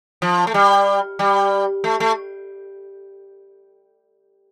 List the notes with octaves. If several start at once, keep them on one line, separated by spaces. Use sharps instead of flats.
F3
A3
G3
G3
A3
A3